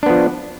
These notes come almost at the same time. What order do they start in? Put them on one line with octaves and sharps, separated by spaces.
D4 B3 F3